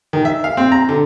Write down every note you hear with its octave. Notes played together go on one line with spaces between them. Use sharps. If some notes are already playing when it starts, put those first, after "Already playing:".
D#3
E5
F5
C4
A#5
D3